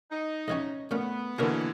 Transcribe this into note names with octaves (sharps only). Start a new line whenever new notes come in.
D#4
G#2 E3 C#4 F#4 C#5 D#5
A#2 A3 B3 C#4 F4
B2 D3 E3 A#3 F4 A#4 C#5